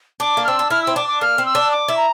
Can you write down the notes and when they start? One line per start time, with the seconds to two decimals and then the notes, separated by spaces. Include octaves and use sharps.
0.20 D4 D6
0.37 A#3
0.45 F6
0.48 C4 E6
0.59 D4
0.70 E4 F6
0.83 C4 E6
0.96 D4 D6
1.08 D6
1.21 A#3 F6
1.38 C4
1.46 E6
1.55 D4
1.71 D6
1.88 E4
1.97 A#5